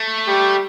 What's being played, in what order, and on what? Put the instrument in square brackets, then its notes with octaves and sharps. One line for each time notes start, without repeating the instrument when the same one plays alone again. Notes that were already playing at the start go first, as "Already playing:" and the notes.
Already playing: [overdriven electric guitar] A3
[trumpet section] G3 G4